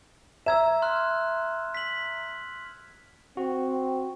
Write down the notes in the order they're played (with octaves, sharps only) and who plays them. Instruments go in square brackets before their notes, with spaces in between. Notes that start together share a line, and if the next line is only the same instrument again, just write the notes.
[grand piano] E5 A#5 [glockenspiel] E6 G#6 E7
[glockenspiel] C6 F6 F#6
B6 F#7
[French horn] C4 [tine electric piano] F#4